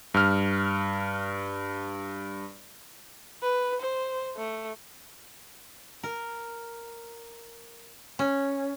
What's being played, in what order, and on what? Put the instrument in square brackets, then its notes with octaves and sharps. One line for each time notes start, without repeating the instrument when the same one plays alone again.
[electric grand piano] G2 F6
[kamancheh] B4
C5
A3
[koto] A#4
C#4